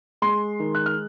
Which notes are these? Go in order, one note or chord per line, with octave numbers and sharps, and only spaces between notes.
G#3 C6
D#3
F#6
F6